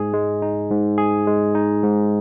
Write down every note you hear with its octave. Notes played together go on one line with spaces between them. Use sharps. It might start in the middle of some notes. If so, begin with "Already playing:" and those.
Already playing: G#2 G#4
G#3
D#4
G#2
G#4
G#3
D#4
G#2